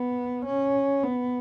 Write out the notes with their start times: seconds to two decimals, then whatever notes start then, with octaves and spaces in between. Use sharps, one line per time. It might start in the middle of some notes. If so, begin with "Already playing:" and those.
Already playing: B3
0.45 C#4
1.03 B3